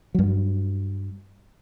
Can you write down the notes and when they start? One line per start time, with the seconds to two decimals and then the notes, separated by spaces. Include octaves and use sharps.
0.15 G2 F#3